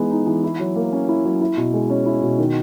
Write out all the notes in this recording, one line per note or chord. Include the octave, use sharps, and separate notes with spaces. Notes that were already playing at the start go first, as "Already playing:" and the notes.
Already playing: E3 G#3 B3 D#4
D#4
E3
E4
F#3
A#3
C#4
E4
F#3
E4
B2
G#3
C#4
E4
B2
D#3